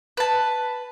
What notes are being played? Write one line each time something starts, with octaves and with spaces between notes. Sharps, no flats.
B4 A5